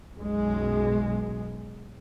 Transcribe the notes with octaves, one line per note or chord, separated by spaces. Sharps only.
B1 F#2 G#3